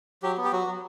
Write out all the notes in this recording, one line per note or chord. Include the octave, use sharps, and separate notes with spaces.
F#3 G4
B3
G4
F#3 F#4
F#3